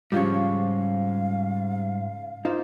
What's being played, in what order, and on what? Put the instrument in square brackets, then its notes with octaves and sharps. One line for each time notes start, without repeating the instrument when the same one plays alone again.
[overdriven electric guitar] G#2 [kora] C#3 F3 G4 [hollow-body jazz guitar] G3 C#5 [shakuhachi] F5
[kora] A#3 F4 C5 [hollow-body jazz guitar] D#4